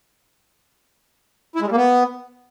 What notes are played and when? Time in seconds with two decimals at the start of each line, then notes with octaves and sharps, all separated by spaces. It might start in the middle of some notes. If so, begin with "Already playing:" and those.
1.56 E4
1.61 G#3
1.66 G3
1.71 A#3
1.77 B3